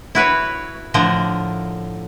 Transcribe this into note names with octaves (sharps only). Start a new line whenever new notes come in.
E4 F#4 B4 C#5
A2 D3 F3 A#4